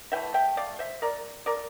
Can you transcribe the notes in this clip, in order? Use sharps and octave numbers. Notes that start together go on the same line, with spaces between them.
E3 A3 E5 G5
E5 G5
D5 F5
C5 E5
A#4 D5
A#4 D5